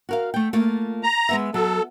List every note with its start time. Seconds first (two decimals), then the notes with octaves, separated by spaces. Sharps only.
0.09 F#4 A#4 F5
0.34 A3 G5
0.53 A3 A#3 F4
1.03 A#5
1.29 G#3 B3 E5
1.54 F#3 A4